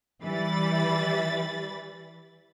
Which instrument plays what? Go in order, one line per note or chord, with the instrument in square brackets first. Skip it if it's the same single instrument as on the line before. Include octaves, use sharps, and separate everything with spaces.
[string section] E3 G3 B5 A6